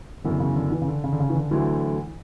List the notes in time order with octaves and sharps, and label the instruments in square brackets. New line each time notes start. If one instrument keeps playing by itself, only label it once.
[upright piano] F#1 F#2 E3 B3 [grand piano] D3
[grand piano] C#3
D3
E3
C#3
D3
C#3
D3
C#3
E3
D3
[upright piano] D2 D3 F#3 A3 E4 [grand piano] E3